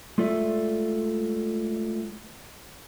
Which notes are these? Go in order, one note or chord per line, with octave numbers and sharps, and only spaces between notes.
G#3 A3 F4 A4 D5 E5